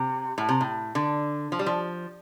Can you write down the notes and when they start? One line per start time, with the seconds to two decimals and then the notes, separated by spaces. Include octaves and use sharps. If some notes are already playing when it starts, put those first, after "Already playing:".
Already playing: C3
0.38 A2
0.49 C3
0.61 A2
0.95 D3
1.52 F3
1.59 G3
1.66 F3